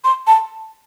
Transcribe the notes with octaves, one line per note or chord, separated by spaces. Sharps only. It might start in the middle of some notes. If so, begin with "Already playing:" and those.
C6
A5